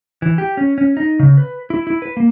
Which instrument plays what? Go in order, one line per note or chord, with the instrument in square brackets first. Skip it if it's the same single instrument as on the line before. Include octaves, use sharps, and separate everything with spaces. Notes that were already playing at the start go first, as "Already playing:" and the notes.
[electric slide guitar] E3
G4
C#4
C#4
D#4
C#3
B4
E4
E4
B4
A#3